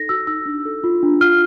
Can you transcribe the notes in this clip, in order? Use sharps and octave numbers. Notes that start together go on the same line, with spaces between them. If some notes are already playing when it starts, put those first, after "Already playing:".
Already playing: D#4 A4 A#6
F#4 E6
D#4 E6
D4
A4
F4
D4
F4 F6